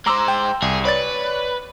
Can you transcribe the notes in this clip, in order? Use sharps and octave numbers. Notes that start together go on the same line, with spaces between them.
G#3 C5 A#5 D6 E6
G5
C2 G#4
B4 C#5 D5 A6